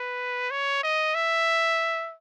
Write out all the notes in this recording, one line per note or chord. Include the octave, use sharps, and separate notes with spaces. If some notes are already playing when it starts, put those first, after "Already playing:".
Already playing: B4
C#5
D#5
E5